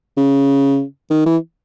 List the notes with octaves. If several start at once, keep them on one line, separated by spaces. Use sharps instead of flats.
C#3
D#3
E3